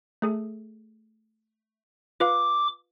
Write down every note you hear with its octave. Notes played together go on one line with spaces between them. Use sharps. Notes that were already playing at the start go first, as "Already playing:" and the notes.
A3 G#4 A4
F4 B4 F5 D6